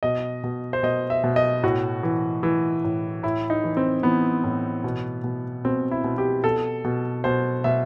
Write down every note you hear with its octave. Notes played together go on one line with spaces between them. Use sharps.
B2 D#5
B2
C5
B2 D#5
E5
B2
D#5
A2 F#4
E3
E3
A2
A2 E4
D#4
E3
C4
E3 B3
A2
B2
B2
B2 C4
E4
B2
G4
B2 A4
B2
B2 C5
B2 E5